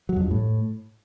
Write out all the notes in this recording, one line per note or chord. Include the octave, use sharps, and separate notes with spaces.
F#3
F2
G2
A2